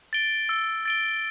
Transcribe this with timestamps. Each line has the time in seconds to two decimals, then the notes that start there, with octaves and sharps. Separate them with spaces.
0.13 A6 D7 G7
0.49 E6
0.85 A6 D7 G7